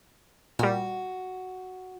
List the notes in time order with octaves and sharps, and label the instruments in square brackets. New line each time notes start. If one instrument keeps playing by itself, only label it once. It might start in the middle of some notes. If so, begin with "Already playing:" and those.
[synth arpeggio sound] A#2 G3 [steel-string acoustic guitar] F#4